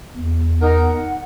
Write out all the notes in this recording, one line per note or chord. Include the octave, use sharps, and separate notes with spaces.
E2
D#4 A#4 F#5